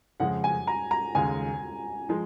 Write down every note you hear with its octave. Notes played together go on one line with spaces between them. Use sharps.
F2 C#3 G#3 F#5
G#5
A#5
A#5
D#2 C#3 G#3 G#5
F3 G#3